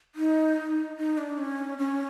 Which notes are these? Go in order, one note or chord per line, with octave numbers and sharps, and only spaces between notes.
D#4
D#4
D4
C#4
C#4